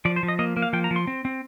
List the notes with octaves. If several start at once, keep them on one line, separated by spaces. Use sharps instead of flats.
F3 D5
C5
F3
D#5
A#3 D#5
A#3
F5
F3 G5
A#5
F3
C6
C4
C4